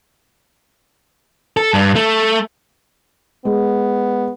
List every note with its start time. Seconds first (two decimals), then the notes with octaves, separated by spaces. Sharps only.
1.57 A4
1.74 G2
1.96 A3
3.45 G#3 B3